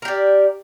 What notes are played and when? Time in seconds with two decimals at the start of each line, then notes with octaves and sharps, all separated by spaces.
0.02 A#4
0.05 G4
0.08 D5